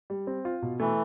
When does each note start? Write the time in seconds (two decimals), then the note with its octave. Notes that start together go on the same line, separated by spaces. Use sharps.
0.10 G3
0.27 C4
0.45 F4
0.62 B2
0.80 E3 A3